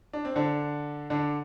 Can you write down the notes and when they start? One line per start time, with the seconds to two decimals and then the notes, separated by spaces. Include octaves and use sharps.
0.13 D4
0.25 C4
0.36 D3 D4
1.10 D3 D4